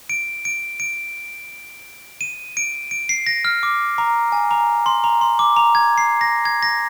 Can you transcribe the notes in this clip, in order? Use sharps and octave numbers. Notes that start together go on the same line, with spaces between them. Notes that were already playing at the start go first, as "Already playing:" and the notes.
D7
D7
D7
D#7
D7
D7
C7
A#6
F6
D6
A#5
G#5
A#5
C6
A#5
C6
D6
A#5
G#6
C7
A#6
G#6
A#6